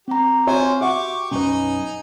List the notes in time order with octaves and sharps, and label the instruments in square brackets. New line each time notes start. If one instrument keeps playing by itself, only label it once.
[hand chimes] C4 A#5 [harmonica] G4
[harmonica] F3 C5 G#5 [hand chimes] C4 C#6 [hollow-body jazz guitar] F#4 C#5 E5
[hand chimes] C6
[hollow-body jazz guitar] F#4 E5 F#5 [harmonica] G4 C#6 D6
[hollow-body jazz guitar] B1 F#2 B4 [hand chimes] C#4 [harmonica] D#4 G#4